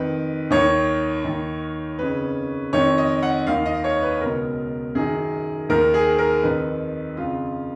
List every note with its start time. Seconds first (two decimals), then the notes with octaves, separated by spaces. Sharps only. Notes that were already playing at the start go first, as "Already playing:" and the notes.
Already playing: F2 D#3 B4
0.51 D#2 D#3 C#5
1.25 D#2 D#3
1.99 F2 C#3 B4
2.73 F2 D#3 C#5
2.98 D#5
3.23 F#5
3.47 D#2 D#3 F5
3.66 D#5
3.84 C#5
4.02 B4
4.21 C#2 B2 A#4
4.95 F#2 D#3 G#4
5.69 D#2 D#3 A#4
5.94 G#4
6.19 A#4
6.43 F2 D#3 B4
7.17 F2 C#3 F4